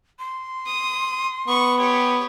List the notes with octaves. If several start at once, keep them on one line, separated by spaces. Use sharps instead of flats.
C6
D#6
B3 C#6
G4 C#5